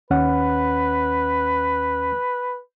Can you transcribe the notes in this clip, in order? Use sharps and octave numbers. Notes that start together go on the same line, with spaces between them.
D#2 C#4 B4 F#5